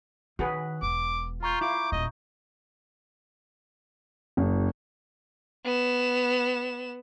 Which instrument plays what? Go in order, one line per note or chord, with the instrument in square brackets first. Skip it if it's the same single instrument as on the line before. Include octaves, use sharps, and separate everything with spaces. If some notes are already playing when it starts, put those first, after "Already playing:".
[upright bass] D#3 [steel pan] F#4 G#4 B4
[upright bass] E1 [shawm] D6
[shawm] F4 [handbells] A#5 C#6 G6
[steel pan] E4 F4 [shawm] D6
[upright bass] D#1 [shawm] D#5
[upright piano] F#1
[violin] B3 E7